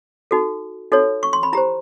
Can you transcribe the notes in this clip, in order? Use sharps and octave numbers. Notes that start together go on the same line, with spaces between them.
D#4 F#4 A4
D#4 F#4 A4 C#5
C#6
C6
B5
E4 G4 C5 A#5